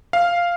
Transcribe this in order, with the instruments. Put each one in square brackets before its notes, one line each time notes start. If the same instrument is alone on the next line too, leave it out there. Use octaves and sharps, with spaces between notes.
[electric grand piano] F5